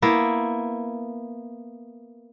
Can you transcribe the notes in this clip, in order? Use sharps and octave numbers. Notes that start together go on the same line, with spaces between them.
A#3 B3 E4